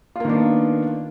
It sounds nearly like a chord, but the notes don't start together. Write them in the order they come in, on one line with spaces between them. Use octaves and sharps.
F4 A#3 D#3 D4 B3